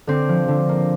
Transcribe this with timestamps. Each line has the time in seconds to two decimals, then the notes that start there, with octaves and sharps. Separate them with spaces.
0.07 D3 C4
0.29 F3
0.48 D3
0.69 A#3